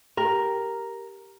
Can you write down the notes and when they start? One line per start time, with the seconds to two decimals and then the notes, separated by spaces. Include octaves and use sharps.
0.17 G4 A#4